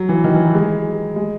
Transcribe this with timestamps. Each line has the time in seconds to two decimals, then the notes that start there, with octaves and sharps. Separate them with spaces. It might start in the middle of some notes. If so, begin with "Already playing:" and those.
Already playing: F#3
0.09 E3
0.24 D#3
0.34 E3
0.44 F#3
0.55 G#3
1.16 G#3